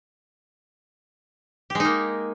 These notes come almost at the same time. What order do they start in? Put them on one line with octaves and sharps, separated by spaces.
G4 G#3 D#4 A#3